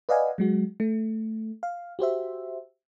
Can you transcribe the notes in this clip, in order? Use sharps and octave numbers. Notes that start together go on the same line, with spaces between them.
B4 D5 D#5 F5 F#5 G#5
F#3 G#3 F#4
A3
F5
F#4 G4 C5 E5